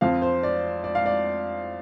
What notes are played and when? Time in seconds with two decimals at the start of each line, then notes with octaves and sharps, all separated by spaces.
0.01 F2 F3 C4 F5
0.22 C5
0.43 D5
0.84 D5
0.95 F5
1.06 D5